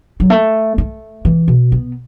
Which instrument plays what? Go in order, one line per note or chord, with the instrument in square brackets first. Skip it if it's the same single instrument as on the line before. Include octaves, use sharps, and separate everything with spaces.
[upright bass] F#3
A3
A3
E3
B2
B3